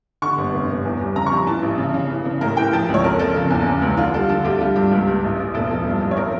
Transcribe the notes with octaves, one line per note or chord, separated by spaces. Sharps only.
D3 C#6
G1
F1
F1
E2
G3
C#3 A#5
C#6
F3 A#5
E3 A5
A1
C#3
C#3
E3
C#3
A2 A#4
E3 G5
F3 A5
C#2
C#5
F2 A#4
F3 A4
C#3
E2
C#3
C#2
D3 F4
G3 A4
D3 A4
D2 G4
G3 F4
G2 G4
C#2
C#2
A1
A1
E1 A4
F3
G2
A1
C#5
F3 A#4